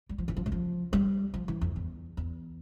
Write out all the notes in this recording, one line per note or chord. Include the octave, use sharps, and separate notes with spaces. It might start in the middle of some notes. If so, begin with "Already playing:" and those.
G3
F3
E3
F3
G3
F3
G3
F3
E3
F2
E2
E2